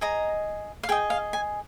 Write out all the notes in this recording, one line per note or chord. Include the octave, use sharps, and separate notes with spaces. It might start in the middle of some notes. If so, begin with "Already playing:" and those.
G#4 D#5 A#5
F5
G#4 D#5 G5
F5
G#5